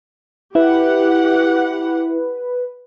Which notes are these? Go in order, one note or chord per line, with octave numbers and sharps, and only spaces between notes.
E4 G4 B4 F#5